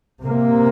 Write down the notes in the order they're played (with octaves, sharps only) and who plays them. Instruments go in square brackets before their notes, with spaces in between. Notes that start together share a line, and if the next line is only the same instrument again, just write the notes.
[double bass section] C3 A#3